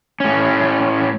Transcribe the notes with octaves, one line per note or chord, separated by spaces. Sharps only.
A2 C#4